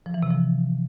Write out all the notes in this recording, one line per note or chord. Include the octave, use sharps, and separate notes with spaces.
F3
E3
C3
F3